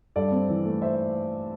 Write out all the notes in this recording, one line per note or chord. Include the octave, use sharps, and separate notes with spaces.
G2 A4 D5
C4
E3
A3
C5 E5